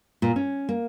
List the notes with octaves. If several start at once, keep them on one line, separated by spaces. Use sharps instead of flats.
A#2
C#4
A#3